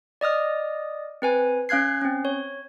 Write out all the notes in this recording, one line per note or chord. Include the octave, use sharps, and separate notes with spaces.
D5 D#5 D#6 F6
C4 B4 G#5
C#4 F5 F#6 G#6 C7
C4 C#4
C#5